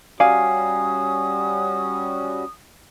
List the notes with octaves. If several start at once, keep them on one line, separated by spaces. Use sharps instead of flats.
G3 C#4 F#4 D5 F5 G#5 D#6 C7